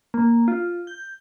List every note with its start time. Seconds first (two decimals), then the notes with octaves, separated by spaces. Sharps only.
0.14 A#3
0.48 F4
0.87 G6